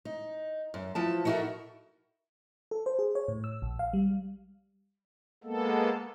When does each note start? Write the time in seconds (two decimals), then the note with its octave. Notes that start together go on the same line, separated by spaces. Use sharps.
0.05 D#4
0.74 F#2
0.95 E3 F3 A5
1.25 D#4 E4 F#4 G4 A4 A#4
2.71 A4
2.86 C5
2.99 G#4
3.15 C#5
3.28 A2
3.44 E6
3.62 A#1
3.79 F5
3.93 G3
5.44 G#3 A#3 B3 A4